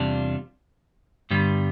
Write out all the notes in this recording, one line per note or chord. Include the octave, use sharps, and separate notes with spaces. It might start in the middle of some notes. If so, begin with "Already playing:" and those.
Already playing: E2 C3 G3 D4 F4
G2 D3 G3 B3